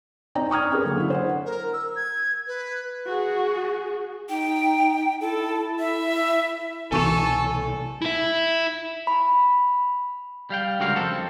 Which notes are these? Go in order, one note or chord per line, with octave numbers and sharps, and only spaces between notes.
C4 D#4 D5 G5 A#5
A#5 C#6 D#6 F6 G#6
C#4 G4 G#4 A#4 B4
D3 F#3 A#3
D3 E4
C5 F#5
A#4
E6
G#6
B4
F#4 G#4
D#4 G5
E4 A4
E5
C2 B2 E3 A4 G#5 C#6 E7
E4 E5
B5
G3 F5 G5
C#2 D3 G3 F#4 A#4 F5
F2 C4 A4